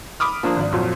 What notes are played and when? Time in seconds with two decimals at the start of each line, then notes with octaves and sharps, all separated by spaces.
0.20 B5 D6 D#6 F6
0.43 F3 A#3 D4
0.56 G#1 D5
0.73 F2 A#2 F#3